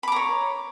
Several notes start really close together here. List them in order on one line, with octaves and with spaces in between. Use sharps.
B5 D6 A#5 C#5